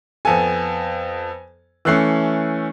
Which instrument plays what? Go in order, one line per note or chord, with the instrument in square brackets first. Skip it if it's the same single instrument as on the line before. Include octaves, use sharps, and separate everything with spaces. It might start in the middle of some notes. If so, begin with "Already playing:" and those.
[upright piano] F2 B3 A4 [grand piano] G#5
[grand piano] E3 A3 C#4 [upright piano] E6 F#6 C7